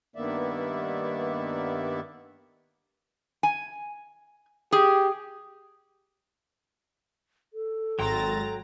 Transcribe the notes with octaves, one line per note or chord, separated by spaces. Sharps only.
G2 D#3 A#3 B3 D5 E5
G#5
G4 G#4
A4
G#1 F#3 G5 A#5 C6 A6 A#6